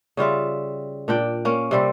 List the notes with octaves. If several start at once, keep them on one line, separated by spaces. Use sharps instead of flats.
C#3 G3 F4 E5
A#2 D4 G5
A#3 C#4
C3 G3 C4